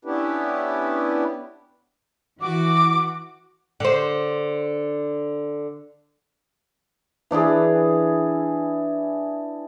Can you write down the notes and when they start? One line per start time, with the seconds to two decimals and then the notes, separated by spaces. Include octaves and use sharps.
0.05 B3 C#4 D4 E4 G4 B4
2.41 E3 F#4 D6
3.80 D3 C5
7.31 E3 D4 E4 G#4